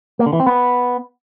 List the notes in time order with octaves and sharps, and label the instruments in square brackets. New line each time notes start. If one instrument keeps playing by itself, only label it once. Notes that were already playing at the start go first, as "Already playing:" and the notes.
[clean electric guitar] A#3
D3
E3
C4
B3